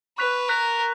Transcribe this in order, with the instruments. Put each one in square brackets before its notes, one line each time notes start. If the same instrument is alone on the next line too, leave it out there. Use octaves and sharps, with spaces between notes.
[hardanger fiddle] B4 [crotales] C#6 F#6 B6 F7
[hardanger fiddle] A#4 [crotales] F#6 B6 F7